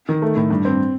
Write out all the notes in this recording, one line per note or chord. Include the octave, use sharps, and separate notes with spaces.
D#3
A3
A2
G2
C4